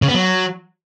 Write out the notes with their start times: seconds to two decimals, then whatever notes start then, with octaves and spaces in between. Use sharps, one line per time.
0.02 C#3
0.08 B3
0.15 F#3